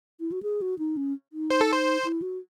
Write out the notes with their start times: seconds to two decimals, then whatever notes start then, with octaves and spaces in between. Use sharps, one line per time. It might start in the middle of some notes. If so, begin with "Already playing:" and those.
0.20 E4
0.32 F#4
0.43 G#4
0.62 F#4
0.79 D#4
0.97 C#4
1.33 D#4
1.50 C5
1.61 A4
1.72 C5
2.04 E4
2.22 F#4